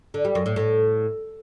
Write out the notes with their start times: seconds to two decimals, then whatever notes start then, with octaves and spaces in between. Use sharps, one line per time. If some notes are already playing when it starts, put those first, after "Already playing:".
0.14 D3
0.25 G3
0.35 F#2
0.46 A2
0.56 A2